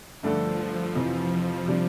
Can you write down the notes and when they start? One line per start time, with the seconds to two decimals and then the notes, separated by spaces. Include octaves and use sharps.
0.22 G2 D3 F3 A3 D4 A4
0.95 F2 C3 E3
1.67 C3 G3 D4